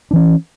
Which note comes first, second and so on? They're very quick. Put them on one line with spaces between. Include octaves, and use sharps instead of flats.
D4 E3 C#4